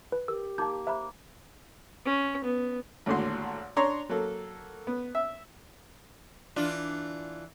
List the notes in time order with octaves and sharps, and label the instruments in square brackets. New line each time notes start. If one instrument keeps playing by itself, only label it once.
[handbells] B4
[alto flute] G4 [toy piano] A#4 [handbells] E6
[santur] A#3 [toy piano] D#4 [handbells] A5 G6
[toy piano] C5 A#5 B5 [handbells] E5
[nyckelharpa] C#4
B3
[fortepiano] G#1 D#2 A2 D3 F#4 C6
D4 C#5 A#5 C6
F#3 A#3 A4
B3
E5
[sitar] E3 D4 F4